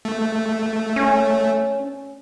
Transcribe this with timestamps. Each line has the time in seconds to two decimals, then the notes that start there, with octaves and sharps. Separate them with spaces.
0.05 A3
0.96 C#4